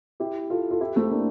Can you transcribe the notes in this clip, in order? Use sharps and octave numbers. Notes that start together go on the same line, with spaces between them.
E4 G4
F4 A4
F4 A4
E4 G4
A3 C4
A#3 D4